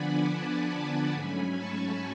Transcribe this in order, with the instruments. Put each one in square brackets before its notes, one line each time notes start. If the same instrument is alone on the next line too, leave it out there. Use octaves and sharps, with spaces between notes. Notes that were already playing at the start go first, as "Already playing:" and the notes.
Already playing: [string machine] D3 F3 B3 D4 D5 F#5 G#5 B5
F#5 A5
F#5 A5
G#2 F#3 A3 C#4 G#5 B5
A5 C#6